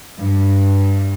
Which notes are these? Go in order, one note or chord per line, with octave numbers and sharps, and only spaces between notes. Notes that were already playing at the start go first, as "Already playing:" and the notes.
G2